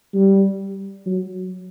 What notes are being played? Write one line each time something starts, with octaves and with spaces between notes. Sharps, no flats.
G3
F#3